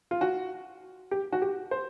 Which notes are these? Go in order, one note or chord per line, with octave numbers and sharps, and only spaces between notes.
F4
F#4
G4
F#4
G4
C5